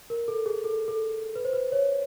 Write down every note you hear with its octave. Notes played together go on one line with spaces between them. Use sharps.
A#4
A4
G#4
A4
A4
B4
C5
B4
C#5